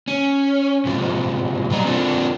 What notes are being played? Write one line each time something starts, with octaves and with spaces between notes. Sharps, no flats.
C#4
G#2 C3 F3
B2 F#3 G3 D5 D#5 A#5
C4 D4 F4 F#4 A4 A#4